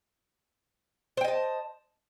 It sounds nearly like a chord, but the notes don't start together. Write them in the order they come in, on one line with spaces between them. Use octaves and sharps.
C5 G5 D#5 A5